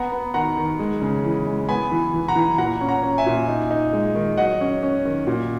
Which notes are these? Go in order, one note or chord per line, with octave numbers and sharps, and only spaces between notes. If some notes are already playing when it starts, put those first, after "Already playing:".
Already playing: B3 F#5 A#5
B3
D#3 F#5 A#5
D#3
G#3
C#3
E3
G#3
B3 G#5 B5
E3
E3
F#5 A#5
E3
A#2 F#5 A#5
C#4
F#5 A#5
C#4
E5 G#5
A#2
D#4
D#4
G#3
D#3
F#3 D#5 F#5
C#4
C#4
D#3
A#2